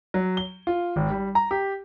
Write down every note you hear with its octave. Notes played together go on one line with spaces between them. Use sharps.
F#3
G7
F4
G#1
G3
A#5
G4